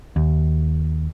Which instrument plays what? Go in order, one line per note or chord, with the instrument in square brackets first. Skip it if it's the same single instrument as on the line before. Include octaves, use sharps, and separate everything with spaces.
[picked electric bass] D#2